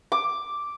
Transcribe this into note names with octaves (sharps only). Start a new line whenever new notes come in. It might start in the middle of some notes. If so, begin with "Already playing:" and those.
D6